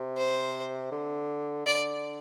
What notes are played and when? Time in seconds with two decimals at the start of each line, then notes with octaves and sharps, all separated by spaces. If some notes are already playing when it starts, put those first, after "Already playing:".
Already playing: C3
0.18 C5
0.92 D3
1.66 D3 D5